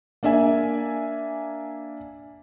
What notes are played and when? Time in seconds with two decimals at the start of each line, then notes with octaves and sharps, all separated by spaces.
0.23 A#3 D4 D5 E5 G#5